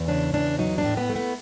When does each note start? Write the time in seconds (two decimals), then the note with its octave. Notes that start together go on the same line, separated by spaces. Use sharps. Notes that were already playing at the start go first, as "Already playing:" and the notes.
Already playing: E2
0.08 C#3 D4
0.34 E2 D4
0.59 F#3 D#4
0.78 D4
0.84 A2
0.97 B3
1.10 A3
1.16 B3